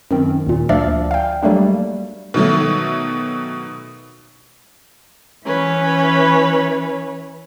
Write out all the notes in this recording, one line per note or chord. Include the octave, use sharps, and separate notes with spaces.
F#2 D#3 C4
D#2 A#2
D2 F3 D4 D5 E5 F5
F5 G5
F#3 G3 A3 A#3 D4
B2 D#3 F#3 A3
E3 C#4 B4 C#5